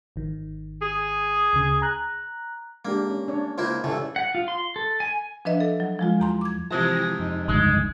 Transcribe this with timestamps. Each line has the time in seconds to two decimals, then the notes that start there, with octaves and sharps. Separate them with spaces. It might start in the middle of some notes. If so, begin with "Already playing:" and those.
0.16 G#1 D#3
0.82 G#4
1.53 D2 C#3
1.82 A#5 F#6
2.85 G#3 A#3 D4 G4
3.10 C#4
3.28 C#4 D4 C#5
3.58 C#2 A#3 E4 C5
3.84 C2 A2 C#3 E3 A4
4.16 F#5
4.35 F4
4.48 C6
4.76 A4
5.00 G#5
5.45 F3 D4 B4 D#5 E5
5.60 A4
5.80 F#3
5.99 F3 G#3 F4
6.20 E2 A#5 C6
6.41 D6 G#6
6.71 C3 E3 F3 G#3 G#5 A5 A#6
7.19 F2 D#4
7.48 G1 C#2 G#3